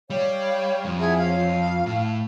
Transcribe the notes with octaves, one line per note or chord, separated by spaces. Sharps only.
G3 C#5 F5 G5
F2
E4 G#4 E5 F#5
C#5 F5
A2 A5